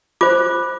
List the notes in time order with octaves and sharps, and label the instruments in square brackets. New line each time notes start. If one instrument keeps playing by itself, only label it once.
[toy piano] F4 C5 D6